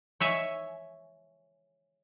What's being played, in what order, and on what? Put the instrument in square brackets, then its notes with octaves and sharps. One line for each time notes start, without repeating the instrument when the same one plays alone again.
[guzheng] C#5 E5 G#5